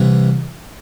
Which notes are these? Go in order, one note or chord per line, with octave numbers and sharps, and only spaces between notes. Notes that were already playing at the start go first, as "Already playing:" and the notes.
Already playing: C2 C3 E3